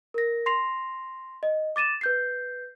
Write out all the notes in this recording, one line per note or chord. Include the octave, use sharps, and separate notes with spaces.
A#4 A#6
C6 A#6 C7 F7
D#5
D6 A6 D#7 E7
B4 G6 C7